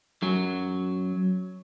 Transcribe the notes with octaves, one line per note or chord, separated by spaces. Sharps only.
F#2 F#3